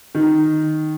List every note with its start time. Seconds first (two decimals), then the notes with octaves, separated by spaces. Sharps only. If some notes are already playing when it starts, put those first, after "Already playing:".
0.15 D#3